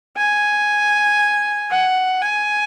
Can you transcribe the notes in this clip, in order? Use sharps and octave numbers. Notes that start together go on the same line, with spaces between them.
G#5
F#5
G#5